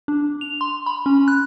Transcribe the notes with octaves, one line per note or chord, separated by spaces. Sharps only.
D4
F7
C6
B5
C#4
F#6